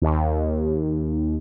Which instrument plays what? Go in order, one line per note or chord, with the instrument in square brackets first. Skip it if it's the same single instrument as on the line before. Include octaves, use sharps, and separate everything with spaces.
[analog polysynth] D#2